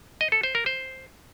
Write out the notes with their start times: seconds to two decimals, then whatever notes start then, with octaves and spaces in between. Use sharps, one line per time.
0.21 D#5
0.32 A4
0.43 C5
0.55 A#4
0.66 C5